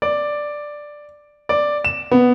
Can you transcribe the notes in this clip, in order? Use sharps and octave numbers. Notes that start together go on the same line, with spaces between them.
D5
D5
E7
B3